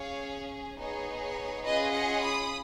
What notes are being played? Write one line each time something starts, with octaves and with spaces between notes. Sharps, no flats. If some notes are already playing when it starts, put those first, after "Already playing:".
Already playing: C#4 G#4 C#5 F5
B3 D#4 G#4 C#5
C#5
C#4 F4 G#4 B4 D#5
D#5 F#5
B5 D#6